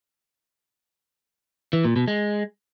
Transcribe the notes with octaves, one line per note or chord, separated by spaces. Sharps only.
E3
A#2
B2
G#3